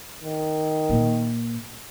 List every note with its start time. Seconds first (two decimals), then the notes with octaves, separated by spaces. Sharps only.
0.23 D#3
0.89 A#2